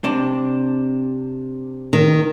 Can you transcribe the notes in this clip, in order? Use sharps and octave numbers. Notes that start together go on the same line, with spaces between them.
C3 D4
D#3